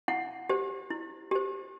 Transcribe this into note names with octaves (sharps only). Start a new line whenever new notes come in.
E4 F#5
G4 C5
E4
G4 C5